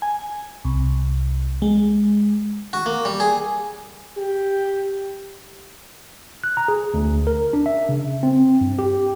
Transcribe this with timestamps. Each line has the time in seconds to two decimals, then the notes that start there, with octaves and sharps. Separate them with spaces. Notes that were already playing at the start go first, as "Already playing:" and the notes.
0.02 G#5
0.65 C2
1.62 G#3
2.73 F#4
2.86 A#3
3.05 G3
3.20 G#4
4.18 G4
6.44 F#6
6.57 A#5
6.68 G#4
6.94 D2
7.27 A#4
7.53 D4
7.66 E5
7.89 C#3
8.23 C4
8.61 G2
8.79 G4